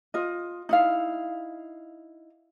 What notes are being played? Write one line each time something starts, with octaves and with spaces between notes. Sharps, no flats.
F4 D#5
D#4 E4 F5